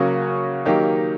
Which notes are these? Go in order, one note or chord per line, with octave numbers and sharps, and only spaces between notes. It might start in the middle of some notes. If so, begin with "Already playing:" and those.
Already playing: C#3 F#3 A#3 C#4 F#4
D#3 F#3 A#3 D#4 G4